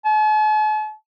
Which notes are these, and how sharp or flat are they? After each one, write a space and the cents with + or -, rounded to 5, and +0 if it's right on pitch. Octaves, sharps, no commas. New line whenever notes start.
A5 -45